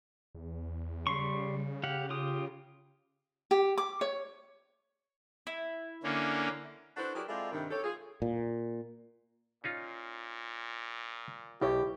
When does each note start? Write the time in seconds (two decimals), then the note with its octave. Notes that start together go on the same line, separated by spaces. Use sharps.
0.35 E2
1.07 C#3 G3 C6 C#6
1.84 G4 F5 F#5
2.10 F4 G4 D#6
3.51 G4
3.78 D6
4.01 C#5
5.47 E4
6.03 D3 A#3 C#4
6.97 D4 E4 F#4 A4 B4 C5
7.15 F#3 E4 G4 G#4 A#4 D5
7.29 G#3 C4 E4 F4 A4 D5
7.52 G2 C3 D#3
7.71 G4 A4 C#5
7.83 F4 G#4
8.22 A#2
9.64 A#2 C#4 D#4 F4
11.61 B1 B2 E4 G4 C#5